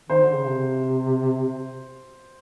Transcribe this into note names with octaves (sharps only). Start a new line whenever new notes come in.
D#3 C5
D3
C#3
C3